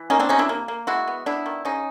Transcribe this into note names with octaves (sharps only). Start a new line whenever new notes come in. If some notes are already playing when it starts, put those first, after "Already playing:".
Already playing: E3
A#3 C#4 D#4
C4 D4
C3 C#4 D#4
D4 E4
A#3
A#3
G#3 E4 F#4
B3
B3 D4 E4
D#3
C#3 C#4 D#4